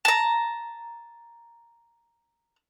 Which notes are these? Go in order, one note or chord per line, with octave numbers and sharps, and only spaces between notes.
A5 A#5